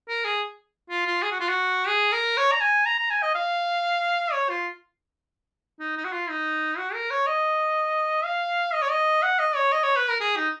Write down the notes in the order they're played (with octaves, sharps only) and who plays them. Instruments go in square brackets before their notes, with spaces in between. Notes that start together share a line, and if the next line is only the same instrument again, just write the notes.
[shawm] A#4
G#4
F4
F4
G#4
F#4
F4
F#4
G#4
A#4
C#5
A#5
G#5
A#5
A#5
G#5
D#5
F5
C#5
F4
D#4
D#4
F#4
F4
D#4
F#4
A#4
C#5
D#5
F5
D#5
C#5
D#5
F#5
D#5
C#5
D#5
C#5
B4
A#4
G#4
D#4